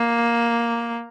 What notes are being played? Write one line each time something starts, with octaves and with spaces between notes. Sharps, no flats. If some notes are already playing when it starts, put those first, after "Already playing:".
Already playing: A#3